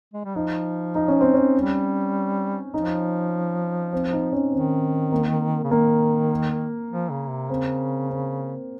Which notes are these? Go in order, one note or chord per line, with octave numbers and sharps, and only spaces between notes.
G#3
G3
F3 D#4
D#4
C#4
C4
C#4
G3
F3 D#4
C4
D#4
C#4
D#3 C4
A#3
C#3
D#3 A#3
F3
C#3
C3
C#3 C4
C4